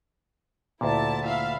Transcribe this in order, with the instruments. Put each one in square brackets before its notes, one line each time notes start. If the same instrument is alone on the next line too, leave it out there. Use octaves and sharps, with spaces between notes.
[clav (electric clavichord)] D2 A#2 [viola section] E4 A5
[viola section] E5 F5 B5